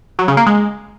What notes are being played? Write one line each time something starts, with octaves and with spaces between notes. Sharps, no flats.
F#3
C#3
A#3
G#3